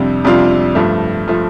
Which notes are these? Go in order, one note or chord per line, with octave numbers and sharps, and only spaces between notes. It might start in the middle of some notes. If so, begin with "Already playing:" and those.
Already playing: F2 C3 G3 D4 F4
F2 C3 G3 D4 F4
G2 F3 A3
F3 A3